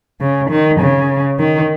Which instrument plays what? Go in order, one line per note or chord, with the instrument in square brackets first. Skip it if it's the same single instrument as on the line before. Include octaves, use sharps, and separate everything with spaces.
[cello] C#3
D#3
C#3
D#3